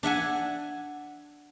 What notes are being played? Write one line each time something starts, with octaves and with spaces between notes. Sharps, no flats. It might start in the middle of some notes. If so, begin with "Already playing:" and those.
D4 E5 F#5 G#5